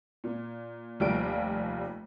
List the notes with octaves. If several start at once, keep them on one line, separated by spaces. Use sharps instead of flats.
A#2
F1 D#2 G3 F4 D7